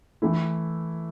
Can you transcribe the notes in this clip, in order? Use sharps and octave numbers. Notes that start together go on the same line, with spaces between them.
E3 A3 E4